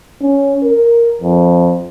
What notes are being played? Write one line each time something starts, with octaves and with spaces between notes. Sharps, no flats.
C#4
A#4
F2